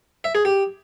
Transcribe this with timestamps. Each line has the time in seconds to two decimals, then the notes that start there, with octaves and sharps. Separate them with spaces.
0.24 E5
0.35 G#4
0.45 G4